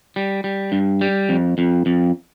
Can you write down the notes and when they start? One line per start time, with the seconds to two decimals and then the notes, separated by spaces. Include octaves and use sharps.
0.16 G3
0.44 G3
0.72 G2
1.01 G3
1.29 F2
1.58 F2
1.86 F2